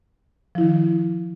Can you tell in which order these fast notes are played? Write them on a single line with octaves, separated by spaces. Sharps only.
F3 E4 D#3